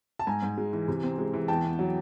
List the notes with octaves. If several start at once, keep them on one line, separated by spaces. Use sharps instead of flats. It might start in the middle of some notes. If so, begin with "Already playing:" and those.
A5
G#2 G#5 A#5
G#2
G#3
E3
C3
C4
G#3
E3
E2 G5 A5
B3
F#3